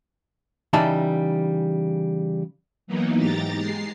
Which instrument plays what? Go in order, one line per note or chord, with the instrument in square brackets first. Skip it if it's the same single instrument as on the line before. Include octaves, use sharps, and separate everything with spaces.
[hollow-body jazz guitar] C#3 E3 G3 D#4 E5 A5
[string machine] E3 F#3 A#3 B3 D#4
G#2 G4 A#5 A6
G#3 C7